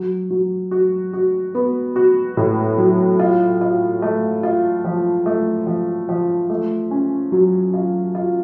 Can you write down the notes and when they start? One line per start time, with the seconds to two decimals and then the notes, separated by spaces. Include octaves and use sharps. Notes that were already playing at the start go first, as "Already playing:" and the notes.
Already playing: F#3
0.30 F#3
0.71 F#4
1.13 F#4
1.55 B3
1.96 F#4
2.37 A2
2.78 F#3
3.19 F4
3.61 F4
4.02 A3
4.43 F4
4.85 F3
5.26 A3
5.67 F3
6.09 F3
6.50 A3
6.91 C#4
7.32 F#3
7.74 F4
8.15 F4